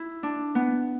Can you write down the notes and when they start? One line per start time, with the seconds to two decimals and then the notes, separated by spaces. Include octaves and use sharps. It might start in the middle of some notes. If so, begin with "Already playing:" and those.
Already playing: E4
0.23 D4
0.55 B3